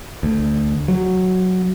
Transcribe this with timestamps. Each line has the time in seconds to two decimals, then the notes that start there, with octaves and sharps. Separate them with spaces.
0.23 D2
0.88 F#3